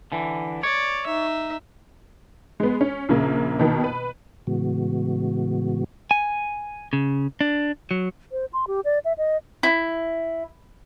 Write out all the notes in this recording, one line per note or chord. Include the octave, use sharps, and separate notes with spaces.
D3 E3
C#5 D5
D#4 E5
G#3 B3
C#4
A#1 C#3 A#3
B2 D#3 A#3
B4
A2 C#3 E3 G#3 B3 F#4
G#5
C#3
D4
F#3
C5
C6
G4
D5
E5
D#5
E4